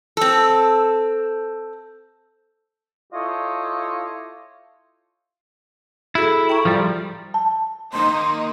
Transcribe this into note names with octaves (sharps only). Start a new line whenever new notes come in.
C4 A4
E4 F4 G4 A4 C#5 D#5
E4 F#4 G#4 A4
G5 A#5 C#6
F3 G3
A5
D#3 A#3 D#4 C6